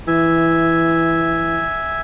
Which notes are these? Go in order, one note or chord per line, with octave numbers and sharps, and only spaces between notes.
E3 E5 G#5